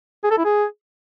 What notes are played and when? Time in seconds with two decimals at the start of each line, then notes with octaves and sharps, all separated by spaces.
0.24 G#4
0.31 A4
0.38 E4
0.45 G#4